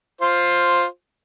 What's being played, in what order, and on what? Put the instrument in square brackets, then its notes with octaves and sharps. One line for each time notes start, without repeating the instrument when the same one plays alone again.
[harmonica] F4 C5